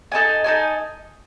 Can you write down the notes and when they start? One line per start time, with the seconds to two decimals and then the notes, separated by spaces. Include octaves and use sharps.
0.12 D#4 A4 D#5 G#5
0.44 D#4 A4 D#5 G#5